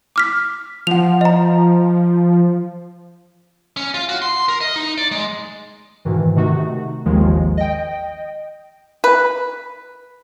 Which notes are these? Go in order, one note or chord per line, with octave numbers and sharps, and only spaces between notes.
D6 F6 B6
F3 F#5 F7
D#5 A#5
C#4
F4
F#4
C6
A#4
D#5
D#4
D5
G#3
G#2 B2 D#3 E3
C3 D#3 A3 D#4 F#4
G#1 D#2 D#3 F3 G#3
D#5 G5
B4